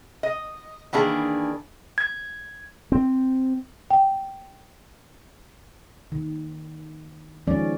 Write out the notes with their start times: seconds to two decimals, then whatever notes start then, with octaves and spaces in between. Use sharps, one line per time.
0.23 D#5
0.93 D#3 E3 A#3 D4 G#4
1.98 G#6
2.92 C4
3.91 G5
6.12 D#3
7.47 D#3 F3 G#3 C#4 D5